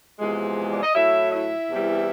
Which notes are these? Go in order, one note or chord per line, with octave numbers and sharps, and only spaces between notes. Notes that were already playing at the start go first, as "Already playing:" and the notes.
E2 C3 F3 G#3
D5
D#5
A2 F#3 E4 E5
E4 E5
E2 C3 E3 G3